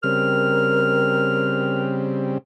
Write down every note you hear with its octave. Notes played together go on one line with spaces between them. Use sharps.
C#3 G3 C4 A#4 F6